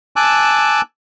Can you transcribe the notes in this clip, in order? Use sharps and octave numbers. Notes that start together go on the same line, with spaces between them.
G#5 A5 D6 E6 F#6